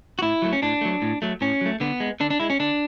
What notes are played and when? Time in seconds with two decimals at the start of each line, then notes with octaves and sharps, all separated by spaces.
0.19 F#4
0.22 A2 E4
0.42 F#3 A3
0.53 C#4
0.62 A2 D4
0.81 F#3 A3
1.02 A2
1.22 F#3 A3
1.41 A2 C#4
1.61 F#3 A3
1.80 D3 B3
2.00 G#3
2.20 D3 D4
2.30 D4
2.40 G#3 E4
2.50 C#4
2.60 D3 D4